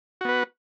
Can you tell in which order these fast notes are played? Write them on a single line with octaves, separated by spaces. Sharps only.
F#4 B3 B4